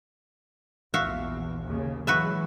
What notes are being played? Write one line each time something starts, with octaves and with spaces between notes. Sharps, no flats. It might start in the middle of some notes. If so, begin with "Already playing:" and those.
A#1 E2 F#4 E5 F5
D#2 C#3
E3 F#3 G#3 F#4 B4 E5